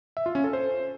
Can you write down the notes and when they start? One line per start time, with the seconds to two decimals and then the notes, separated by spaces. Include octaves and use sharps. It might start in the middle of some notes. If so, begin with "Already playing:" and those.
0.17 E5
0.26 F4
0.35 C#4
0.44 A4
0.53 C5